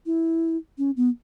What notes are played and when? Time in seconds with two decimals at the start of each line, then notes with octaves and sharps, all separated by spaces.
0.06 E4
0.78 C#4
0.97 B3